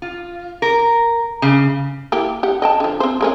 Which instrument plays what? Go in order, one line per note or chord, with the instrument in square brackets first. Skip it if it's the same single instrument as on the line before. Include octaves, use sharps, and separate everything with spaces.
[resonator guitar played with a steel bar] F4
A#4
C#3
[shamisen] A#3 E4 G4
G4 F#5
D#5 G5 A5
D3 F3
C4 C5
G#3 A#3 C#4